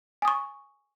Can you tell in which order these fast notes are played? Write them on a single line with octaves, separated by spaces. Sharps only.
G#5 D#6 C#6